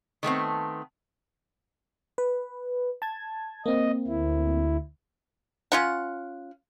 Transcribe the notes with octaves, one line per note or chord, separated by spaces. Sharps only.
D#3 A3 B3 C4
B4
A5 G#6
A#3 C4 D#5
D2 E4
C#4 F4 F#5